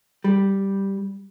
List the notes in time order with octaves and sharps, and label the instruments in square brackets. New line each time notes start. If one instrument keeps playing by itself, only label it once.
[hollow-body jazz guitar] G3